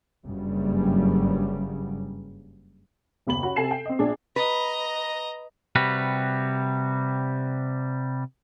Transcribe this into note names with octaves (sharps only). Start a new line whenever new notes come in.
F#1 G2 C#3 F#3 G3
F#1 D#2 B5 F#7
C#4 F#4 B5
C3 A4 G#5 C7 E7
G5
C4 D#5
A#1 D4 G#4
B4 D#5 A#5
C3 G3 F#4 B4